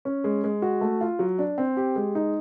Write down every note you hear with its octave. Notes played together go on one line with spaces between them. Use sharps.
C#4
G#3
G#3
F#4
A3
F4
F#3
D4
C4
G4
G#3
D#4